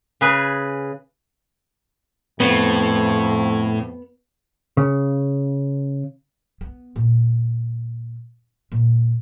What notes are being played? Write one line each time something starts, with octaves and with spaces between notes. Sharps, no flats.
C#3 G#4 B4 G#5
F2 A2 B3
C#3
B3
A#2
A#2